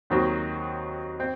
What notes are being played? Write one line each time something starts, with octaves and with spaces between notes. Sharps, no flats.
D#2 D#3 F#3 C4 F#4
C4